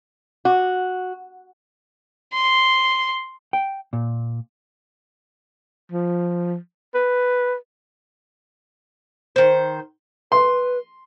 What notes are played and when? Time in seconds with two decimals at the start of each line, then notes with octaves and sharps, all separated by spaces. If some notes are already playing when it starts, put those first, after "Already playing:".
0.45 F#4
2.33 C6
3.53 G5
3.93 A#2
5.92 F3
6.94 B4
9.36 D#3 C5
10.32 B4 C6